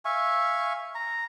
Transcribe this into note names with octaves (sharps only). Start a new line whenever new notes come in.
E5 F5 G#5 C#6
A#5